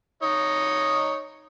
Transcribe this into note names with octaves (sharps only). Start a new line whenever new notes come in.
D#4 C#5 D#5